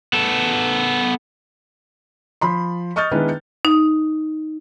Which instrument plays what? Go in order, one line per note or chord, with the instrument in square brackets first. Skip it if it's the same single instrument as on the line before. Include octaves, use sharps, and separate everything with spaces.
[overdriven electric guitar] B3 A4
[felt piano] F3 B5 C6
D#5 C#6 D#6 F6 G6 A6
D#3 G#3 B3 D4 E4 B4
[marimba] D#4